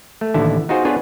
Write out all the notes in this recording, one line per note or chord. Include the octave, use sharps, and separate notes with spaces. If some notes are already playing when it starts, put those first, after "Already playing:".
A3
A1 D#2 D3 E4 A5
B3 D#4 F4 F#4 G#4 C5
B3 D4 F4 G#4 B4 C#5